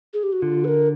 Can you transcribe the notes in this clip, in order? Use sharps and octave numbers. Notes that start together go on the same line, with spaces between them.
G#4
G4
F#4
D3 F4
B4
A#4